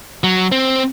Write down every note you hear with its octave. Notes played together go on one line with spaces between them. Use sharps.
F#3
C4